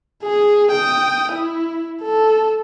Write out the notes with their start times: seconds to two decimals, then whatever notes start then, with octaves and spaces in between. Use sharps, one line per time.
0.23 G#4
0.72 G5 D#6
1.33 E4
2.03 A4